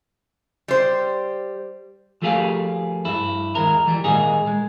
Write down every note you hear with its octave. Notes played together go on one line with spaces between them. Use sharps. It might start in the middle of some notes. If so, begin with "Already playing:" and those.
G3 C5
F3 A3 A#3 G4 G#4 F5
G2 E4
D#2 G#3 A#4
E3 G3
A#2 D#3 G#3 A#3 D#4 G#4
G#3